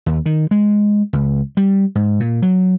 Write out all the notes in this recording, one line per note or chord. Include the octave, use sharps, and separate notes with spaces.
D#2
D#3
G#3
C#2
G3
G#2
A#2
F#3